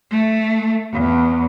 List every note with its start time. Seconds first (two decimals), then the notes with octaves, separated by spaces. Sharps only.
0.10 A3
0.93 E2